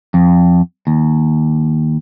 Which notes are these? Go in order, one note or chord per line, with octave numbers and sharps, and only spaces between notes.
F2
D#2